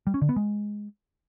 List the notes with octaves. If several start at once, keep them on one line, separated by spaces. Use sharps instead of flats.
G3
C#4
D3
B3
G#3